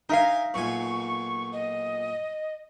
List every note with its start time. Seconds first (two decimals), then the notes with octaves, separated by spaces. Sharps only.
0.09 D#4 A#4 E5 F5 G#5
0.54 B1 A#2 G#5 C#6
1.53 D#5